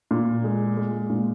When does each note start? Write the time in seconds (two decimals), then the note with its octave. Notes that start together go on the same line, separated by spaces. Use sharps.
0.11 A#2
0.44 G#3
0.77 G#3
1.10 A#2